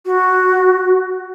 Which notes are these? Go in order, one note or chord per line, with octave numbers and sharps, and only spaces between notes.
F#4